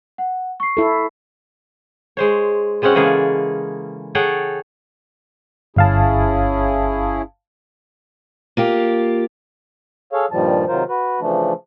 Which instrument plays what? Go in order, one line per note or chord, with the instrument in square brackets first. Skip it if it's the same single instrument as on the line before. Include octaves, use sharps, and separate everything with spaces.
[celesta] F#5
C#6 C7
[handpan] E4 A4
[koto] G#3 C5 C#5
B2 G#3 C4 C#4 F#5
C#3 E3 G#3 A#3 G#4 A4
G#4 A4 C#5 F#5 G5
[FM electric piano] G1 F5 A5 [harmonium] C#4 E4 G#4
[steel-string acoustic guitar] A#3 F4 G4
[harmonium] G#4 A4 C#5 F5
G2 A#2 D#3 F3 G3 A5
C3 D#3 F#3 F4 A#4 C5
F#4 B4
C#3 E3 F3 A3 D4